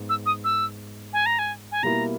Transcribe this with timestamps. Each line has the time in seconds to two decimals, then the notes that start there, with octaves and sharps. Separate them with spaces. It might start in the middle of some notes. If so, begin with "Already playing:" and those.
Already playing: G#2 B3
0.09 E6
0.26 D#6
0.44 E6
1.13 G#5
1.26 A#5
1.39 G#5
1.72 G#5
1.83 B2 G3 A#3 E4 A#5